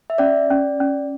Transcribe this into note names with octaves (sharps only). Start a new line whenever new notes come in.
E5
C#4 D5
C#4
C#4